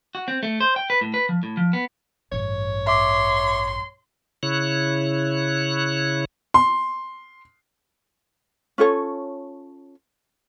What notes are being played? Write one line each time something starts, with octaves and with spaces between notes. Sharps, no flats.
F#4
C4
A3
C5
G5
B4
A2
B4
F3
A2
F3
B3
A1 G2 C#5
E5 C6 D6
C#3 E4 C#5 F#6
C6
C#4 F4 A4 C#5